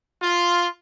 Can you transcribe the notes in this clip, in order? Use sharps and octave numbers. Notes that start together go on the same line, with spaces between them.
F4